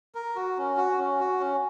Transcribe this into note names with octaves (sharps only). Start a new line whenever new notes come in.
A#4
F#4
C#4
F#4
C#4
F#4
C#4